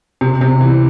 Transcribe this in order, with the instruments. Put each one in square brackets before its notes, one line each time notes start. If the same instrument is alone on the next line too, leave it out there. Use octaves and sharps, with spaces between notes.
[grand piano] C3
C3
E3